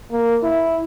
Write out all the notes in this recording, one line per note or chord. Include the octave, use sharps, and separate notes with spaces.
A#3
E4